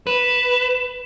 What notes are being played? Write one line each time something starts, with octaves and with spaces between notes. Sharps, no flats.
B4 E7